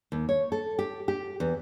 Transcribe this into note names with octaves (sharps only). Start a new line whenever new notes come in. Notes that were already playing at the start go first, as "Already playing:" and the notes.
D#2
C#5
A4
G4
G4
E2